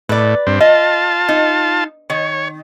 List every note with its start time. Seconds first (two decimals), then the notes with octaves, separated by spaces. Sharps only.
0.09 A2 B4 D5
0.47 G2 C4
0.61 F4 D#5 A5
1.29 D#4
2.10 D#3 C#5